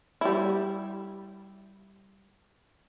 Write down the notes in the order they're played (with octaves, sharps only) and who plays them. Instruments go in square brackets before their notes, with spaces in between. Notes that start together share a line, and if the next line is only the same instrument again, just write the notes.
[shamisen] G3 E4